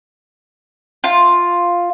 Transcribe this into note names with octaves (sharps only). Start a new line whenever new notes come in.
F4